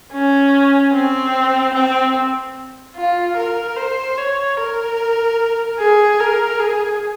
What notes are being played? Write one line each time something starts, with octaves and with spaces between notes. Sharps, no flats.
C#4
C4
C4
F4
A#4
C5
C#5
A#4
G#4
A#4
G#4